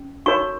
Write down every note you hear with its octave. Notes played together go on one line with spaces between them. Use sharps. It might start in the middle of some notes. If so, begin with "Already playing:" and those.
Already playing: C#4
D#4 F#4 A#4 C#5 C#6